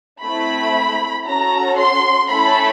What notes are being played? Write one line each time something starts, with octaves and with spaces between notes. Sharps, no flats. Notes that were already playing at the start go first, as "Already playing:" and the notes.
A3 C4 E4 B5
C#4 F#4 A4 A#5
C6
A3 C#4 E4 A4 B5